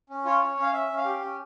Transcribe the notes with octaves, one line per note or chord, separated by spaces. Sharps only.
C#4
F4 C#5
C#4
C#4
F5
C#4 E5
C#4
F5
G4
C#4